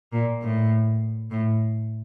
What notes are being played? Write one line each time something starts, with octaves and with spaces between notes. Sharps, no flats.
A#2
A2
A2